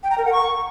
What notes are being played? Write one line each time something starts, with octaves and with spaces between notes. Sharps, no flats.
G5
A#5
A#4
F#5
C#6